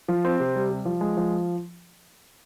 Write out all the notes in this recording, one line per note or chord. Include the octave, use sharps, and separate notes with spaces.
F3
C4
C3
G3
G3
F3
G#3
F3